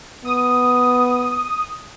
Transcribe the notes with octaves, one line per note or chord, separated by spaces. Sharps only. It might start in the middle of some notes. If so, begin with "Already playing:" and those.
B3 D#6